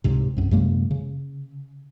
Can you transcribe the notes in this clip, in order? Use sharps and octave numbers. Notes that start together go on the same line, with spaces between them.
C#2 G#2 C3
C2 F#2
F#2 C3 G#3 A#3
C#3